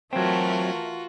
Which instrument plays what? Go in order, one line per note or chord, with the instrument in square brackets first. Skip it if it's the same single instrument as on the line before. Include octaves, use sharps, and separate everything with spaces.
[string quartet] E3 A3 A#4 [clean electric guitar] F#3 C4 [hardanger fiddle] F4 F#4